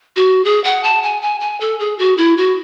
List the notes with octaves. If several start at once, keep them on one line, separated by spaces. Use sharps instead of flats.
F#4
G#4
F#5
A5
G#5
G#5
G#5
A4
G#4
F#4
E4
F#4